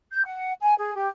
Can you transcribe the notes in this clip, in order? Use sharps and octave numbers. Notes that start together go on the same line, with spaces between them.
G6
F#5
G#5
G#4
G4